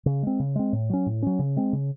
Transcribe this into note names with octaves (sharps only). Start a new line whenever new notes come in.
C#3
G#3 C4
C#3
G#3 C4
A2
F#3 C#4
A2
F#3 C#4
C#3
G#3 C4
C#3